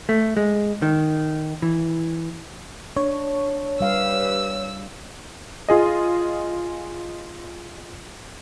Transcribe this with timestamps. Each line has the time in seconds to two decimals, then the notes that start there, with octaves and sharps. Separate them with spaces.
0.09 A3
0.37 G#3
0.82 D#3
1.62 E3
2.97 D4 C#5
3.80 G2 G3 G4 B4 F5 E6
5.69 F4 G#4 D#5